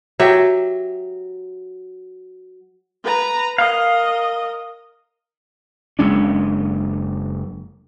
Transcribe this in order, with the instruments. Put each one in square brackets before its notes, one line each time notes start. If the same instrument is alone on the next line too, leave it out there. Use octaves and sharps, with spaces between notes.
[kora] F#3 G4 E5
[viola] B4 A#5
[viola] A#4 D#5 [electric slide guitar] F5
[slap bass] F#1 G#3 C#4 D4